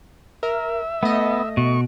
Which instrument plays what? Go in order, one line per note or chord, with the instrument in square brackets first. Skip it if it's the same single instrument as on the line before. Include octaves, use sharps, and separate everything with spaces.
[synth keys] A#4 [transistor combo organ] E5
[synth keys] A3 D#5 [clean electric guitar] B3
[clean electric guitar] B2 [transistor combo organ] C#6